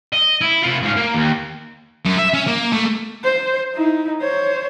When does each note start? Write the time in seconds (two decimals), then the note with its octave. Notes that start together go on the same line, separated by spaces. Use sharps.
0.13 D#5
0.41 E4
0.63 C3 F4
0.82 G#2 F5
0.96 A#3
1.14 D#2
2.06 F#2
2.19 E5
2.34 C#4
2.47 A#3
2.72 A3
3.24 C5
3.74 D#4 E4
4.22 C5 C#5